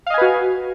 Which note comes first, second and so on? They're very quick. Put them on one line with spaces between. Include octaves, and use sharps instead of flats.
F5 D#5 G#5 B4 F#4